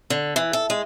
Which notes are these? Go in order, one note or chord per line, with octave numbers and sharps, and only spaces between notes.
D3
E3
A4
G#3